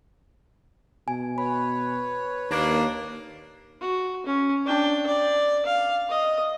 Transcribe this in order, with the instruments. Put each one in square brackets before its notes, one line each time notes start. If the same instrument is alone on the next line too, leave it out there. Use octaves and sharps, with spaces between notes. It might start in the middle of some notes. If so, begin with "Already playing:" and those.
[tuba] B2 [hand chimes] G#5
[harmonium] B4 C#5 [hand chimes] B5
[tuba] D#2 [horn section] A#3 D4
[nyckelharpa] F#4
C#4
D4 G5
D5
F5
D#5